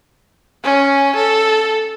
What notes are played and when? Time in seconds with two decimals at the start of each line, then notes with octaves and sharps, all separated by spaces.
0.63 C#4
1.16 A4